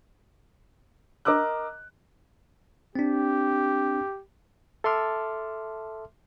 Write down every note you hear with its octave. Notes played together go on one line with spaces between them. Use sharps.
A#4 D#5 D6 E6 F#6
C4 D4 G4
A4 E5 A5 C6 D6 F6